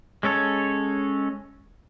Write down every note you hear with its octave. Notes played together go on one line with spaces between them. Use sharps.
G#3 C#4 A4 C#5